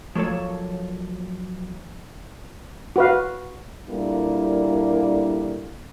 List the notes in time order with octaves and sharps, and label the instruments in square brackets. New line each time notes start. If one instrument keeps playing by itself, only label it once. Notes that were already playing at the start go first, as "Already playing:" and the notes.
[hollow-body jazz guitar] F3 F#3 A#3 A4 C#5
[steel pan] F#4 B4 F5
[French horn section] A#2 G3 A#3 D4 E4 A4